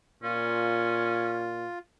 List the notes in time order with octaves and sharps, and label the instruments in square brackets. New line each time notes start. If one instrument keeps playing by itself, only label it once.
[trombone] A#2 [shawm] C#4 [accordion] F4